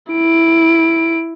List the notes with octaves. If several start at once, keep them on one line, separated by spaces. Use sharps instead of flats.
E4 D7